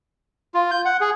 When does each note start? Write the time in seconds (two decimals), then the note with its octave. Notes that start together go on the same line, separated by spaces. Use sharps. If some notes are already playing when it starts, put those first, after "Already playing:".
0.54 F4
0.71 G6
0.85 F#5
1.01 G#4